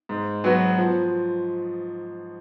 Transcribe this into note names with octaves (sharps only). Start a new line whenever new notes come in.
G#2
F#3 B3 F#4 B4
F3